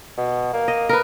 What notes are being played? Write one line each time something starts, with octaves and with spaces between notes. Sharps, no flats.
B2
A#3
D#5
A#4 B4